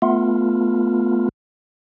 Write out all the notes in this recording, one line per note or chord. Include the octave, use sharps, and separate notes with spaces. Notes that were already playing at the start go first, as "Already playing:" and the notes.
A3 B3 F4